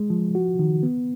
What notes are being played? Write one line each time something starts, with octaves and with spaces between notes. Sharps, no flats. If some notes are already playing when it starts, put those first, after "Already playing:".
Already playing: G#3
F3
F#4
D#3
B3